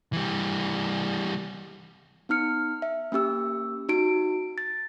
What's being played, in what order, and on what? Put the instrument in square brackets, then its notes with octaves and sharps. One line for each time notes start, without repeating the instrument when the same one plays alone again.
[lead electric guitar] E3 G3
[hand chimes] B3 D#4 F6 C#7
E5
A#3 C#4 G4 E6
D#4 F#4 D7
A6